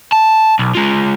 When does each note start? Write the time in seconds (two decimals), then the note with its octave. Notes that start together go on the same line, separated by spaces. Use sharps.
0.12 A5
0.59 B1
0.75 G#3 F4